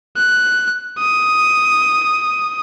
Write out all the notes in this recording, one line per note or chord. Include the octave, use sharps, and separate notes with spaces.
F#6
D#6